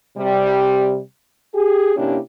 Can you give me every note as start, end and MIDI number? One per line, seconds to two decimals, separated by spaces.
0.17 1.00 48
0.17 1.00 55
1.55 1.95 67
1.55 1.95 68
1.96 2.19 48
1.96 2.19 58
1.96 2.19 61
1.96 2.19 62
1.96 2.19 64
1.96 2.19 67